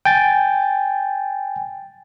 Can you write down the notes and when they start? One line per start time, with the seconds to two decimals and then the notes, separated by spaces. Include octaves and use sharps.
0.05 G5 G#5 A6